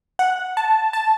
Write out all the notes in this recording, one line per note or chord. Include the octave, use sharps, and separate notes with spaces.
F#5
A5
A5